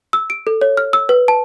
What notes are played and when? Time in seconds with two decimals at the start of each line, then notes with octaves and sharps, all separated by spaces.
0.13 E6
0.30 D7
0.47 A4
0.61 C#5
0.77 F6
0.93 E6
1.09 B4
1.28 A5